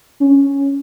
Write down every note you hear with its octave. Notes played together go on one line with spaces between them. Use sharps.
C#4